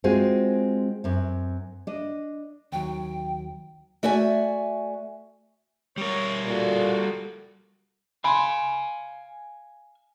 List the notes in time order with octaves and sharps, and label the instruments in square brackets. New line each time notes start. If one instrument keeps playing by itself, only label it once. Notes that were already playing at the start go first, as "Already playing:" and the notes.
[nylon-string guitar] G#3 C4 F4 F#4 G#4 C5
F#2 C4
D4 D#5
[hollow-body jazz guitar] D#2 F#3 [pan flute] G5
[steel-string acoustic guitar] A3 F#4 D5 E5 G#5
[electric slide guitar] G3 A#4 [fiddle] C#5
[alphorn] A#2 [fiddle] F#4 A4
[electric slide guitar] F5 G#5 [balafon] B5 C6